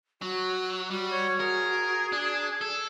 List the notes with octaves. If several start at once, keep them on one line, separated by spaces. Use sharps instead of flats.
F#3 F#4
G3 F#4
C#5
G#4 A#4
D4
A4